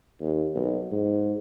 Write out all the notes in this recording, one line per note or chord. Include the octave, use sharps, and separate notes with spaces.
D#2
B1
G#2